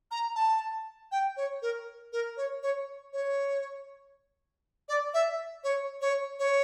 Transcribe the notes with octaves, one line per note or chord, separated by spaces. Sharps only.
A#5
A5
G5
C#5
A#4
A#4
C#5
C#5
C#5
D5
E5
C#5
C#5
C#5